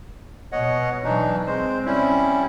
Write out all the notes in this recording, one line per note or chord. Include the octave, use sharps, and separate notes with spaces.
B2 C#5 D#5 F#5
B2 E3 F#3 D4 D#4
G#3 C4 C5
G3 C#4 E4